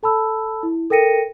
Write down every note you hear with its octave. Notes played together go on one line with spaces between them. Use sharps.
A4 A5 B5 E6
E4
A4 A#4 G5 A#6 C#7 D#7